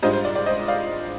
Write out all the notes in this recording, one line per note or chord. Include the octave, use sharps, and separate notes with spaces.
G#2 G3 D4 F4 C5 D#5
C5
D5
D5
C5 D#5
D5 F5